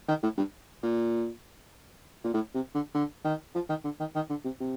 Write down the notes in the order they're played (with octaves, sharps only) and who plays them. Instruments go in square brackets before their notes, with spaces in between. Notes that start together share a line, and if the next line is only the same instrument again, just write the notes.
[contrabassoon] D#3
A2
G2
A#2
A#2
A2
C3
D3
D3
D#3
F3
D#3
D3
D#3
D#3
D3
C3
C3